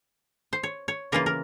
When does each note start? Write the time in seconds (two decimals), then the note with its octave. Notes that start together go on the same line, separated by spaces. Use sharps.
0.53 C5
0.63 C#5
0.88 C#5
1.12 C#3 E3 A#3 F4 A#4
1.26 A#4